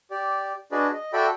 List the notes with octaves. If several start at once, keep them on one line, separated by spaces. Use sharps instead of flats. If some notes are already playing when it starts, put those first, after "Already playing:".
G4 D5
D4 F#4 G#4 B4 D5 D#5
D#5
F#4 A4 D5 E5 G5 B5